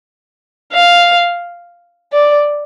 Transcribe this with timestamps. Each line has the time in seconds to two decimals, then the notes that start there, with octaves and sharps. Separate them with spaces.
0.72 F5
2.13 D5